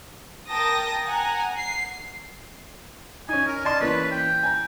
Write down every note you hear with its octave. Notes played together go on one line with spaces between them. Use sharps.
A#4 G5 A5 D#6 A#6
F#5 G#5 A#5
C7
C#4 D#4 G#5
A#4
D5 D#5 A5 C6
E3 A#3 C#4 B4
G5
G#5 A#5